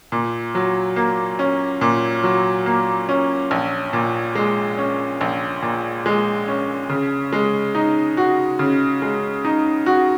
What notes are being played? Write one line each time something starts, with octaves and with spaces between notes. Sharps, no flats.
A#2
F#3
A#3
C#4
A#2
F#3
A#3
C#4
A#1
A#2
G#3
C#4
A#1
A#2
G#3
C#4
C#3
G#3
D#4
F#4
C#3
G#3
D#4
F#4